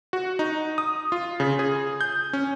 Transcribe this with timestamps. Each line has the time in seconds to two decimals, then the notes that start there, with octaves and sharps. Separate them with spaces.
0.13 F#4
0.39 D#4
0.78 D#6
1.12 F4
1.40 C#3
1.59 G#4
2.01 G6
2.33 C#4